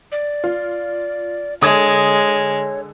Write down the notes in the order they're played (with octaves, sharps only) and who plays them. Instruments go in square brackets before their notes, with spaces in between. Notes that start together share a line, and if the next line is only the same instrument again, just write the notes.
[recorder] D5
[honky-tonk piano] F4
[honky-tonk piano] D3 D#6 G#6 [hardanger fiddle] G#3 [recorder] C#5